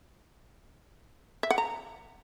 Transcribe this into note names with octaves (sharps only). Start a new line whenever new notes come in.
E5
F#5
A#5